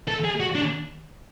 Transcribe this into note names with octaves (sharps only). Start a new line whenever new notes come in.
A4
G#4
F#4
D4